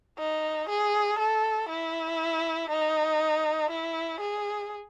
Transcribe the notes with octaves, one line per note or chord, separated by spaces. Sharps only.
D#4
G#4
A4
E4
D#4
E4
G#4